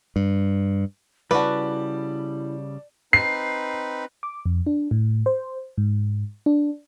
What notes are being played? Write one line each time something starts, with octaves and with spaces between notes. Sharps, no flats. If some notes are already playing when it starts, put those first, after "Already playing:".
G2
C#3 G3 E4 F#4 B4 D5 A5
C4 D#4 B4 C7
D6
F2
D4
A2
C5
G#2
D4